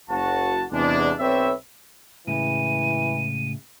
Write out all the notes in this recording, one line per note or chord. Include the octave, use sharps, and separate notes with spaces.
F#1 F#4 A5
E2 C3 G#3 D4
B1 C4 B4 C#5 D5 E5
A2 C#3 E3 G#3 D#7